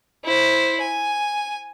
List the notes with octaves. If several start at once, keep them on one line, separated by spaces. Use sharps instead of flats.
E4 C5
G#5